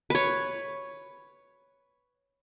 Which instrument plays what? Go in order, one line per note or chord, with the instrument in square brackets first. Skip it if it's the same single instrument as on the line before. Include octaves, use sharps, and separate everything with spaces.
[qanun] B4 C#5